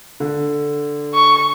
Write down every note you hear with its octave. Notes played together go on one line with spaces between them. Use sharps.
D3
C#6